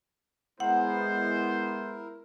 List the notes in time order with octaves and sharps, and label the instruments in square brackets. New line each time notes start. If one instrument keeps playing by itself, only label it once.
[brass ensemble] G#3 B3 [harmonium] E4 A#4 [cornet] C5 [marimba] F#5